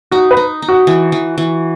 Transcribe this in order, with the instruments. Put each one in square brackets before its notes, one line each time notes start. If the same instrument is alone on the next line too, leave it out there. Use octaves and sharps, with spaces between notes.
[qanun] D#4 [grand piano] F#4
[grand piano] B4
[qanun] D#4
D#4
[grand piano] F#4
[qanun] E3
E3
E3